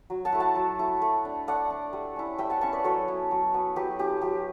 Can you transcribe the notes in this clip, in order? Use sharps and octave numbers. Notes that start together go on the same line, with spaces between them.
F#3
F#5 A5
A3 E4
F#5 A5
F#3
A3 E4
A3
D4
A3 D5 F#5
D4
G3
C#4 E4
G3 E5 G5
F#5 A5
C#4 E4 A5 C#6
B4 D5
F#3 A4 C#5
B3 E4
F#3
B3 E4
F#3 G4 B4
C#4 E4 G4
F#3 G4